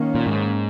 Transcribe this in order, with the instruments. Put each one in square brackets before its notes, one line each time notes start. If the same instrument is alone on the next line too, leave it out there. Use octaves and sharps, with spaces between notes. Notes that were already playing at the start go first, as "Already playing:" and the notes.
Already playing: [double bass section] D#3 A#3 C#4
[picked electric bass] A#2
G#2